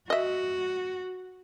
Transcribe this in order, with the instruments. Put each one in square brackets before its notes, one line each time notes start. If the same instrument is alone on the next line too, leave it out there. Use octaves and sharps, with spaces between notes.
[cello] F#4 [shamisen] D#5 E5